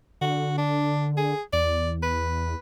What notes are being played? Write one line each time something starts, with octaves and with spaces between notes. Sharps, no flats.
D3 F#4
D4
G#4
E2 D5
B4